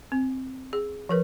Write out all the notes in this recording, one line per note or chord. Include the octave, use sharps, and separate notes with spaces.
C4
G#4
F3 A#4 B4